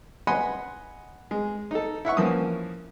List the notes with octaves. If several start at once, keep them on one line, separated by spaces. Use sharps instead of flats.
D#5 F#5 G#5 B5 C6
G#3
D#4 A4
E4 E5 F#5 C#6
E3 F3 A#3 C#4 D#6